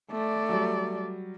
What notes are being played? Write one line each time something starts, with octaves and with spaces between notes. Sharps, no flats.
A3 D5
F#3 G3